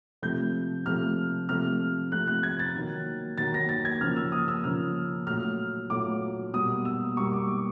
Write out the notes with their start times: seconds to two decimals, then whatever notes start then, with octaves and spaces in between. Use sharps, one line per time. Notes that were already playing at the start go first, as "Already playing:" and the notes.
0.22 C3 F3 A3 G6
0.85 C3 F3 A3 F6
1.49 C3 F3 A3 F6
2.12 C3 F3 A3 F#6
2.27 F#6
2.43 G#6
2.59 A6
2.75 D#3 F#3 A#3
3.38 D#3 F#3 A#3 A6
3.54 A#6
3.69 A6
3.85 G#6
4.01 C#3 F3 A#3 F6
4.16 E6
4.32 D#6
4.48 E6
4.64 C#3 F3 A#3 F6
5.27 A#2 F#3 A3 F6
5.90 A#2 F#3 A3 D6
6.54 B2 G3 A#3 D#6
6.85 E6
7.16 B2 G3 A#3 C#6
7.33 D6
7.48 D6